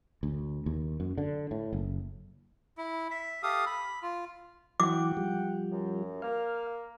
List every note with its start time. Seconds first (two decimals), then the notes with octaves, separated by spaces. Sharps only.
0.23 D2
0.66 D#2
1.00 F#2
1.18 D3
1.51 A2
1.73 F#1
2.77 E4
3.11 E5
3.43 G4 A4 F5 D#6
3.66 B5
4.02 F4
4.80 E3 F#3 F#5 G5 D6
5.17 F3 G3
5.71 F#2
6.22 A#3 F5